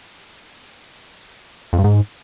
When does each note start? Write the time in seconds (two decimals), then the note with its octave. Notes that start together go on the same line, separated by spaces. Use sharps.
1.73 F2
1.78 G2
1.84 G#2